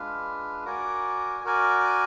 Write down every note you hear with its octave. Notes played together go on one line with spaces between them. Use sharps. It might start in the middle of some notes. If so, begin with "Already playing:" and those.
Already playing: G#3 D4 F4 B4 F5
F#4 A#4 D5 G#5
F#4 A#4 D5 G#5